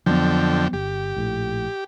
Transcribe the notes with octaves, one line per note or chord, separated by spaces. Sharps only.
F2 D3 F3 F#3 B3 G5
G1 G4
A#1 A2